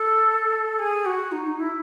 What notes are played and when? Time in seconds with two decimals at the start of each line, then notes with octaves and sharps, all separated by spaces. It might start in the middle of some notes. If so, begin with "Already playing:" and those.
Already playing: A4
0.79 G#4
1.05 F#4
1.31 D#4
1.45 D#4
1.58 E4